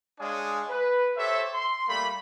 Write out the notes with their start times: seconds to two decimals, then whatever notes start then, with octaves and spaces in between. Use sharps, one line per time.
0.20 G#3 D4 C#5 F5 G#5 D#6
0.69 B4
1.17 G4 A4 C5 C#5 E5
1.54 C6
1.88 G3 A3 A#3 B5